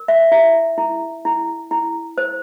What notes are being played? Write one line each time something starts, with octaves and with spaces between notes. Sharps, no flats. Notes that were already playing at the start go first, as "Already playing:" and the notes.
Already playing: A#4
E5
E4 E5
E4
E4
E4
C5